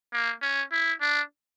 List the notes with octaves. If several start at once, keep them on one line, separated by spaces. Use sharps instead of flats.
A#3
C#4
E4
D4